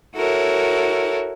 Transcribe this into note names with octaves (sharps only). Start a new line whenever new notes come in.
E4 F#4 A4 A#4 C#5